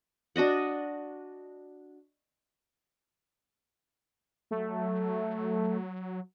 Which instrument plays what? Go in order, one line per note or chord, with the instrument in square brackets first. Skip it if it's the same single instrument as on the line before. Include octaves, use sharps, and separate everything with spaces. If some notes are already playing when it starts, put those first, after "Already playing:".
[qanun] D4 F#4 D#5 F#5
[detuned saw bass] F#3 [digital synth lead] A3